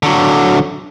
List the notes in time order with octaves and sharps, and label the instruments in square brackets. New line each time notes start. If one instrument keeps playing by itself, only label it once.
[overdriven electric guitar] D3 F#3